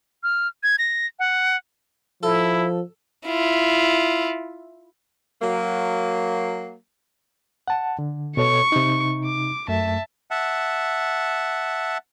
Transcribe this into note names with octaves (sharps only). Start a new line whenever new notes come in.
F6
G#6
A#6
F#5
F3 E4 A4
E4 F4
F#3 A#3
F#5 A5
D3
B2 A4 C#5 C#6
C3 D#4
D6
F#2 A3 E5 A5
E5 F#5 A5